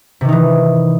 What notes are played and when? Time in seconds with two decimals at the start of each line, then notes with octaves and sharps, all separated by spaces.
0.21 C3
0.25 D#3
0.29 D#4
0.32 E3